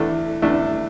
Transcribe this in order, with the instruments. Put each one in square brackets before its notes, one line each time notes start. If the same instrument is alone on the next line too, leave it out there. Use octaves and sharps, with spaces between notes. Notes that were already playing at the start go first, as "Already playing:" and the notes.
Already playing: [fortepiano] E2 E3 A3 D4 [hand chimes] E4 A4
[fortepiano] E2 E3 A3 D4